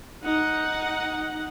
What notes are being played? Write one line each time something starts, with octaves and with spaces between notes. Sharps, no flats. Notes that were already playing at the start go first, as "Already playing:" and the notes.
D#4 F#5